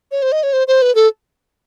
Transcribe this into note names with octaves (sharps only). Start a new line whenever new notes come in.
C#5
C5
D#5
C#5
C5
C5
B4
A4